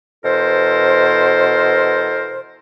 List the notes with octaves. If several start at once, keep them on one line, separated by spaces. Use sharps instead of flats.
B2 E3 A4 A#4 C5